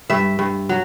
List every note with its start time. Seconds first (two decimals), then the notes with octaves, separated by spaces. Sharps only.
0.10 G2 E5
0.39 G2
0.69 F#3